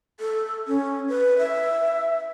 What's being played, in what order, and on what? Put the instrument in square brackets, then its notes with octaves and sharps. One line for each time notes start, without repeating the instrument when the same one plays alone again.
[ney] A4
C#4
B4
E5